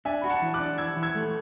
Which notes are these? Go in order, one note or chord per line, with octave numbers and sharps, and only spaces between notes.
D4 E5 G#5
F#4 B5
F#5 A5
E3
D6 F#6
D4
E3 E6 G#6
E3
E6 G#6
A3